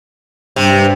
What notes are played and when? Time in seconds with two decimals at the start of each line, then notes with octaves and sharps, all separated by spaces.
0.56 G2 C3